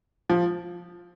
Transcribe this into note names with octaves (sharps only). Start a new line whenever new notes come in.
F3